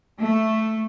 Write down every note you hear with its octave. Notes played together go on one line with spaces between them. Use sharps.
A3